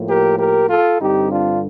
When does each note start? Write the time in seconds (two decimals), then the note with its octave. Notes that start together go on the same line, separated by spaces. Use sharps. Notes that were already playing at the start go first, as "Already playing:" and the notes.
Already playing: A2 F3 A#3
0.08 G4 A#4
0.39 G4 A#4
0.70 F4 A4
1.01 G2 D3 G3 C4 D#4 G4
1.32 D4 F4